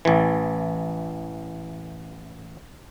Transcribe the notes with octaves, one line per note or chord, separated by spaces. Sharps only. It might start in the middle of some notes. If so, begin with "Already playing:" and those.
A1 E3